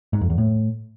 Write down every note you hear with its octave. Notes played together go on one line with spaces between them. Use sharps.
G#2
F2
E2
A2